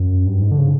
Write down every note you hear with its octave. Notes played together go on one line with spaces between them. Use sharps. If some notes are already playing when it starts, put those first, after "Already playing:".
Already playing: F#2
G2
G#2
D3
C#3